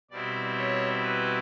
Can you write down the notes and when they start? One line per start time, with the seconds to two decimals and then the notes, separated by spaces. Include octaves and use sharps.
0.11 B2 G3 C4 E4 D5
0.57 C#5
1.02 B4